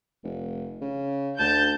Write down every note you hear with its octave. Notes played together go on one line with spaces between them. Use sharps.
F1
C#3
D2 A5 G6